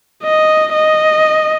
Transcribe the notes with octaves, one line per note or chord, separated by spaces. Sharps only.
D#5
D#5